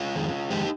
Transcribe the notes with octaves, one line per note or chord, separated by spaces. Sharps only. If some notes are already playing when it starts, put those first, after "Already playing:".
Already playing: C#4 F4
F2 D#3 G#3
F2 D#3 G#3 D#4 G4